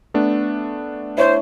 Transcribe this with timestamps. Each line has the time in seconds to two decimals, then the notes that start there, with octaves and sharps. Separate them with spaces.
0.14 A3 B3 D4
1.18 E4 C5 C#5